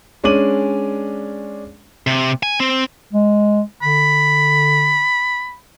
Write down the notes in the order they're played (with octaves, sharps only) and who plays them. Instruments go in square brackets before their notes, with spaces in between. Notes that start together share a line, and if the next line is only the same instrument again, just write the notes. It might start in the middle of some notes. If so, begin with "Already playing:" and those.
[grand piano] G#3 C#4 D4 D6 D#7 F#7
[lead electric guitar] C3
G#5
C4
[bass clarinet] G#3
[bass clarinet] D3 [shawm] B5